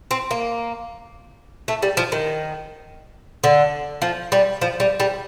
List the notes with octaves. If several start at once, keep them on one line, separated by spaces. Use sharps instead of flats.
C4
A#3
A3
G3
F3
D#3
D3
F3
G3
F3
G3
G3